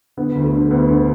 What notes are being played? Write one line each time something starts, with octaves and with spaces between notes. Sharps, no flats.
D3 B3
D2
A3
D3
D2 B3
D2